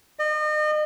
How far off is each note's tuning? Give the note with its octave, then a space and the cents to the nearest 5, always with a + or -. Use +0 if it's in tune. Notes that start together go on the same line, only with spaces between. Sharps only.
D#5 -35